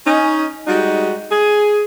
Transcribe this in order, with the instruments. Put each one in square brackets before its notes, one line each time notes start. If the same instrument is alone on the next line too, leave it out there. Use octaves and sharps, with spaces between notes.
[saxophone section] C#4 D#4
G3 G#3 D#4 F#4
G#4